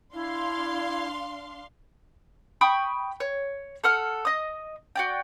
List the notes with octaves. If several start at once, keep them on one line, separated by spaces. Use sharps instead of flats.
D4 E4 F5 C6
G5 B5 C#6 D#6
C#5
A4 F#5 F6
D#5 D#6
F#4 D5 G5